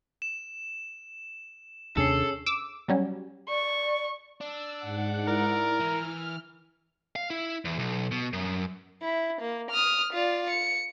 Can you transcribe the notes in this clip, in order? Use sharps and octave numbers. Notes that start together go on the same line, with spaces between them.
E7
D#2 C3 C#4 D4 G#4 A4 E6 C7
D6 E6
F#3 G3 C#4
D5 C#6
D4 E6
G#2 F#5
E4 A#4 D5
E3 F6
F5
E4
E2
B1
B2
F#2
E4
A#3
D#6 F6
F4 D5
C#7